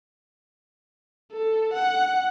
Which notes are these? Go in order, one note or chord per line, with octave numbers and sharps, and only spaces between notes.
A4
F#5